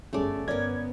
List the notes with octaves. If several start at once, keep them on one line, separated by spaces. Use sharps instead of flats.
G1 G3 A3 C#4 G#4 D5
G1 B3 C#4 A#4 D5 G#6